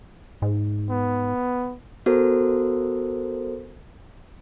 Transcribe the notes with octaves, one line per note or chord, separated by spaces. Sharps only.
G#2
B3
B3 F#4 A4 A#4 C5